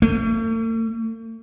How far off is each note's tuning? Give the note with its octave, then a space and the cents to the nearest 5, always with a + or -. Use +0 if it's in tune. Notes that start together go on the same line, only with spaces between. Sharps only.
A3 +45